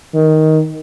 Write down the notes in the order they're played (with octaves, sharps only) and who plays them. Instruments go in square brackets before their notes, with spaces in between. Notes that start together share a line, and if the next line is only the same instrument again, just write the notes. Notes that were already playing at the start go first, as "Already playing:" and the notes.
[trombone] D#3